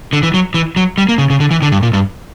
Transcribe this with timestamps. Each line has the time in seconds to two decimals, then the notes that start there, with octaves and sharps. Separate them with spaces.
0.13 D3
0.23 E3
0.34 F#3
0.54 E3
0.76 F#3
0.98 G3
1.09 A#3
1.18 C#3
1.30 C#3
1.40 D3
1.51 E3
1.62 D3
1.72 G2
1.83 A#2
1.93 G2